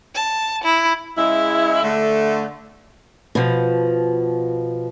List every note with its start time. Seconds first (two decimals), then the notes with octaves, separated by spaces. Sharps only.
0.15 A5
0.64 E4
1.18 C#3 G#3 E4
1.83 D3 A3
3.35 B2 F3